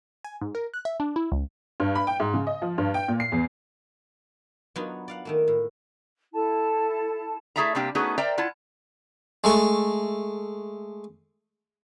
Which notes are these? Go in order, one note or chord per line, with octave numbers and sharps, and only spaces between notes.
G#5
G#2
A#4
F#6
E5
D4
E4
C#2
G2
B5
G5
G#2
C#3
D#5
F3
G2
G5
A#2
C7
E2
F#3 B3 D4 D#4 F4 F#4
D5 F5 F#5
D#3 A3 A#3
A2
E4 A4 A5
A3 E4 G#4 E5 A5 A#5
C3 G3 A#3 C4 D4 G4
A3 B3 C#4 D#4 F#4 G#4
A#4 C5 D5 E5 G5 A#5
E4 F4 F#5 A5
G#3 A3 C#6